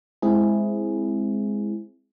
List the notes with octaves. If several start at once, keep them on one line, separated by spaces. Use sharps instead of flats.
G#3 C4 E4 G#4